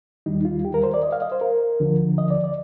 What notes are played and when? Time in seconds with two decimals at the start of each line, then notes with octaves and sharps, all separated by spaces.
0.26 D#2 D#3 G3 D#4
0.45 F4
0.65 G4
0.74 A#4
0.84 C5
0.94 D5
1.03 D#5
1.12 F5
1.22 D#5
1.32 C5
1.41 A#4
1.80 D2 D3 F3
2.18 D#5
2.31 D5
2.44 D5